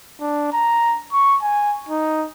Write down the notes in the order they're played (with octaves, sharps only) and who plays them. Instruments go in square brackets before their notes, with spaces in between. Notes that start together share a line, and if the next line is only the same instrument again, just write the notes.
[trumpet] D4
A#5
C#6
G#5
D#4